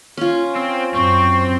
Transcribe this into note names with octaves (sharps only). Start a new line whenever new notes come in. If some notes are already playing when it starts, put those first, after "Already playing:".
C#4 F4
C4
F#2 C4 C#6